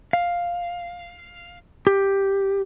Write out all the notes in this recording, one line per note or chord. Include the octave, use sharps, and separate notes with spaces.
F5
G4